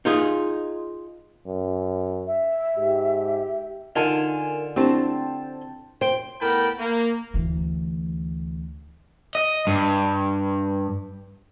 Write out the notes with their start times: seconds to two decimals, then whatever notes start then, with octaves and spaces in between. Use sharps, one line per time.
0.05 D#4 F4 G#4
1.47 F#2
2.27 E5
2.77 G#2 G4
3.96 D3 D#4 F4 A#4 D5 G#5 A5
4.76 C4 D4 E4 G4 C5 G5 A5
6.01 C5 G5
6.41 A2 B3 A#4 G5 A5 B5
6.79 A#3
7.34 D2 E3
9.35 D#5
9.67 G2